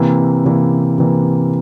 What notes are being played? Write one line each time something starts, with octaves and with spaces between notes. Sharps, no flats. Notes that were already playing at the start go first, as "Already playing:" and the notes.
Already playing: C3 E3 A#3
C3 E3 A#3
C3 E3 A#3